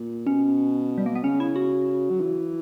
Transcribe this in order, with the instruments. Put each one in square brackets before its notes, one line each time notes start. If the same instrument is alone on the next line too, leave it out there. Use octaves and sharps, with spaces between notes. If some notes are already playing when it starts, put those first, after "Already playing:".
Already playing: [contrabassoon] A#2
[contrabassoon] B2 [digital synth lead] C#4
[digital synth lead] G3
A#3
B3
[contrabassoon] C#3 [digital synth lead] C#4
[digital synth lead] E4
F#4
[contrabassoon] F#3
E3